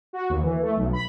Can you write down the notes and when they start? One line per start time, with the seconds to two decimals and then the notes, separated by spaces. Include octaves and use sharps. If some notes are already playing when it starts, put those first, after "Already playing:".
0.13 F#4
0.30 D#2
0.42 E3
0.62 A3
0.77 B1
0.93 B5